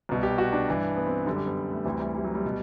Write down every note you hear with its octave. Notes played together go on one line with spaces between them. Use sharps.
C2 B2
G4
F#4
D4
G2 E3
B3
C4
F#2 D3 G3
G3
B3
A3
D2 C3 E3 G3
G3
G3
F#3
G3
B2